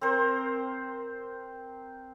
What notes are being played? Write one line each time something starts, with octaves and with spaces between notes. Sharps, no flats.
C4 A#4 C5